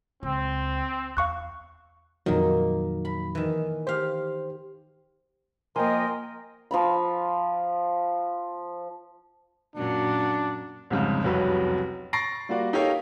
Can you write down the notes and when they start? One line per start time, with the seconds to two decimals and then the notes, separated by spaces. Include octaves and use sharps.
0.23 C#2 C4
1.17 E2 F5 C#6 F#6
2.26 F2 A#2 D#3 F#3 A#3
3.05 B5
3.35 D#3 E3
3.87 G4 C5 F5
5.76 F3 A#3 A#4 D#5 G5 G#5 C6
6.71 F3 A#5 B5
9.76 F#2 A#2 F#3 D4
10.90 C2 F2 G#2 C#3
11.24 F1 C2 F#2 F#3 B4 C#5
12.13 C#6 A6 A#6 C7 D7
12.49 G3 A#3 F4 F#4 D5
12.73 D#4 G4 A4 A#4 C#5 F5